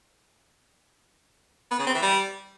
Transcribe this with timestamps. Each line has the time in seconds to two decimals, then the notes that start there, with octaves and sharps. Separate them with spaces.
1.71 B3
1.79 C#3
1.87 C4
1.94 E3
2.02 G3